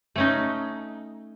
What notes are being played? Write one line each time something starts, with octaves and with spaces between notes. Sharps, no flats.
A3 C#4 D#4